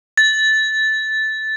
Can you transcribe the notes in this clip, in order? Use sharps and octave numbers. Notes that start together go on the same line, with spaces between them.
A6